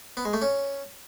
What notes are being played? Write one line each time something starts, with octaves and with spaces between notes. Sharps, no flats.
B3
G#3
A3
C#4